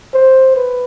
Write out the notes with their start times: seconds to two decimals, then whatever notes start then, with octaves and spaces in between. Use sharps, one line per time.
0.14 C5
0.56 B4